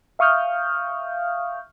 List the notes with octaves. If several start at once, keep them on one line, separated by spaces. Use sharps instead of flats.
E5 F5 C#6 D#6 F6 G6